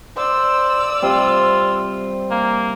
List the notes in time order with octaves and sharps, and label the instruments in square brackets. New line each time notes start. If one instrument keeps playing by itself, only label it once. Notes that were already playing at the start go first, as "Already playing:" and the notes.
[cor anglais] C5 [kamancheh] D5 E6
[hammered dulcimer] C3 G3 C4 [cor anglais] F4
[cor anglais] A#3